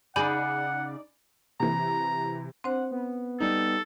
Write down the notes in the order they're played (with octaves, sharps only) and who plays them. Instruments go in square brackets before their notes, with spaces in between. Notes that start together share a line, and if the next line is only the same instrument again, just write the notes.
[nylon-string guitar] C#3 G#4 [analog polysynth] D#4 D5 [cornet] F#5 [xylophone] G#5 B5 G6
[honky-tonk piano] C3 E3 [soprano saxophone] A#5
[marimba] C4 D4 C5 [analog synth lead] F#5
[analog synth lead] B3
[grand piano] G3 D#4 [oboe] A4